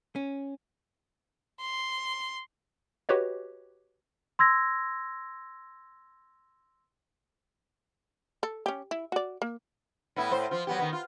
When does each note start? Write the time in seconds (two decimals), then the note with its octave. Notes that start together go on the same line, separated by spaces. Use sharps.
0.16 C#4
1.61 C6
3.09 F#4 G4 B4 C#5 D#5
4.39 C6 E6 G#6 A#6
8.43 A4
8.66 C#4 G4
8.91 E4
9.12 F#4 D5
9.42 A#3
10.16 A2 B3 E4
10.31 A2 C5
10.51 F3 F4
10.67 F#3 B3 G4
10.79 D#3 B3
10.93 F4